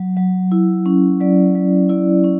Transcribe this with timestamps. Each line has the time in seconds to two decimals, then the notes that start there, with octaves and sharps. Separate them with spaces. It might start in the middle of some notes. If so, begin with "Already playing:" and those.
Already playing: F#3
0.17 F#3
0.52 E4
0.86 C#4
1.21 F#3 D5
1.55 F#3
1.89 E4 D5
2.24 C#4